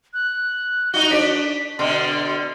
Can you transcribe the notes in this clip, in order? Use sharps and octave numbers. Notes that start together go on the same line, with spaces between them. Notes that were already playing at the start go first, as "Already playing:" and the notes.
F#6
D#4 F#4 G7
D4 D5 B6
B2 D3 C6